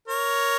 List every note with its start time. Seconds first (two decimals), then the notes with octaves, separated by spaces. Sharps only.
0.08 A#4 C#5